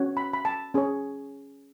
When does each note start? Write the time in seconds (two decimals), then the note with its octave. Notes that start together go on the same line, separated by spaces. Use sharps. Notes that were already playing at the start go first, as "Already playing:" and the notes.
Already playing: C#4 F#4 C#5
0.17 B5
0.34 B5
0.45 A5
0.74 C#4 G#4 C#5